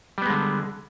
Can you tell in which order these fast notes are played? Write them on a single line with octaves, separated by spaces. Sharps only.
G3 B3 G#3 D3